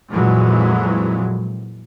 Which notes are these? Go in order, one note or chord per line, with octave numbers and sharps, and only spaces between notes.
F2 A#2 E3 F#3 G#3